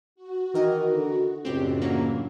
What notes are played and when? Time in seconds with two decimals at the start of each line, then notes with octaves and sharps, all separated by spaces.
0.15 F#4
0.54 D#3 E3 A#4 D#5
0.95 D3
1.45 C#2 F#2 A2 C4 D4 G4
1.82 E3 F#3 A#3